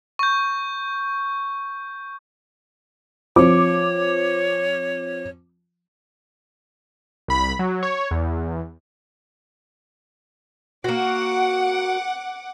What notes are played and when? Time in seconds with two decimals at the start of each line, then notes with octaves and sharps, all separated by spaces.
0.19 C#6 G6
3.36 F3 C4 C#5 D6
7.28 C2 B5
7.59 F#3
7.83 C#5
8.11 E2
10.84 A#3 F#4 F#5 D6